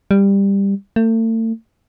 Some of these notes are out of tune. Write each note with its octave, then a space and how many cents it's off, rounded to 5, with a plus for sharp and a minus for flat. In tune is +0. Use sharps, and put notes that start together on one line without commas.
G3 +15
A3 +40